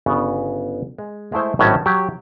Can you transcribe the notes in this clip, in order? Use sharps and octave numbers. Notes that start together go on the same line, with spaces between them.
G1 C#3 B3
G#3
G#3 A3 E4 C5
G#1 A2 F#3 C#4 G4 A5
F#3 G4